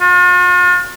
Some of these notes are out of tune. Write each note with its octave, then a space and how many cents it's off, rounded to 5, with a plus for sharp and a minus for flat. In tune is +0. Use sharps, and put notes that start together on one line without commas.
F4 +45